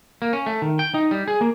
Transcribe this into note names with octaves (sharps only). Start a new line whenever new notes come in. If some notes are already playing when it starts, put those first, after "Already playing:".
A#3
C#4
A3
D#3
G5
D#4
G3
G#4
A#3